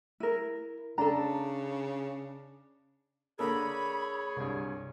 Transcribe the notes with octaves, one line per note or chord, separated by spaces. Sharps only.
E4 A#4
C#3 D4 A4 A#5
D3 A#3 G#4 A4 C#5 B5
C2 G2